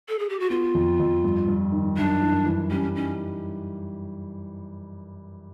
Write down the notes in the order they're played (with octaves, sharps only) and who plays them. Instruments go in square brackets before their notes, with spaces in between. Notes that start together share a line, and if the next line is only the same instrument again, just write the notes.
[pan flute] A4
G#4
G4
F#4
[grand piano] B3 [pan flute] F4
[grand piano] F2
F2
G2
G2
D#3
[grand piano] F#2 [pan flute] D4
[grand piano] E3
E3
[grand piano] G3 [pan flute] C#4
[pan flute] C#4 [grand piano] D#4